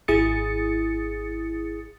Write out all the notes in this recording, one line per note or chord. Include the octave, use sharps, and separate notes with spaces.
G#1 E4 G#4 D#6 A6 C#7